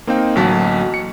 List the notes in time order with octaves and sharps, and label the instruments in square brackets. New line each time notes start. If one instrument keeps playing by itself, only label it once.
[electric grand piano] A#3 C4 D#4 F5 G5
A1 D2 F#3 A#3 A5 B6
C#7